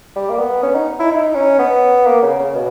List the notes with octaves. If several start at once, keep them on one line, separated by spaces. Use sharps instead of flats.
G3
A#3
B3
C#4
D#4
E4
D#4
C#4
B3
A#3
C#3
C#3
B2